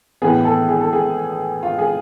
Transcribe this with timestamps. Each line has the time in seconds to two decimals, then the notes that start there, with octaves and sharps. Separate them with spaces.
0.22 A2 E3 B3 G#4
0.45 A4
0.69 G#4
0.81 A4
0.93 G#4
1.63 F4
1.79 G#4